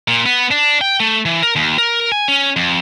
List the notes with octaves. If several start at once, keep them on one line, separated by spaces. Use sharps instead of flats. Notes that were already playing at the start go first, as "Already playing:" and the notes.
A#2
B3
D4
G5
A3
E3
A#4
D#2
A#4
G#5
C#4
F2